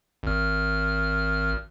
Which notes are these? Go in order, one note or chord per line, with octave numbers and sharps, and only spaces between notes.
G#1 F6